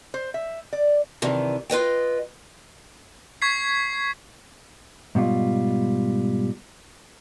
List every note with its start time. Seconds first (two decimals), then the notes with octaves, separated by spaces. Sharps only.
0.14 C5
0.34 E5
0.73 D5
1.22 C3 D#3 E3 D4
1.70 F4 B4 D#5 G5
3.42 C#6 G#6 B6 C7
5.15 G#2 B2 G3 F4